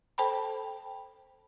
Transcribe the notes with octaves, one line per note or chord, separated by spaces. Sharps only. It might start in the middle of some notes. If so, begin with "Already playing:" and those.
A4 C5 G5 A5 B5